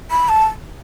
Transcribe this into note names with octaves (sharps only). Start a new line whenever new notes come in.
B5
A5